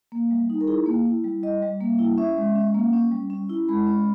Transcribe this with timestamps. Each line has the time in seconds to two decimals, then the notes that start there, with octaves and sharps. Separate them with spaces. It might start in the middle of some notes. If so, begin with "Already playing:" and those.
0.12 A#3
0.31 G3
0.50 D#4
0.61 A#4
0.68 E4 G#4
0.86 A#3
1.06 E4
1.24 G3
1.43 G3 D#5
1.62 G3
1.81 A#3
1.99 E4
2.18 C#4 E5
2.37 G#3
2.55 C#4
2.75 A#3
2.93 C#4
3.12 G3
3.30 C#4
3.49 E4
3.68 G#3 B5
3.87 C#4